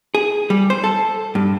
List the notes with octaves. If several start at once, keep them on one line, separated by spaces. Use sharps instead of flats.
G#4
G3
C5
A4
G2